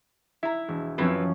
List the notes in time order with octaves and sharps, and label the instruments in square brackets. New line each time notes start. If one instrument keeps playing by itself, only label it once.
[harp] E4 [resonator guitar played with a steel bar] E5 A#5
[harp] E1
[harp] F#2 F3 C#4 [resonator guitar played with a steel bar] C4 E4 B4